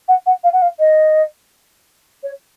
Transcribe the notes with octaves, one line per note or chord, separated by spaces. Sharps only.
F#5
F#5
F5
F#5
F5
D#5
C#5